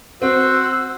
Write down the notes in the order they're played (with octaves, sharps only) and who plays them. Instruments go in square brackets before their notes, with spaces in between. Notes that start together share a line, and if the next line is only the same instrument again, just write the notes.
[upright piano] C4 [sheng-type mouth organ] F#4 C5 [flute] E6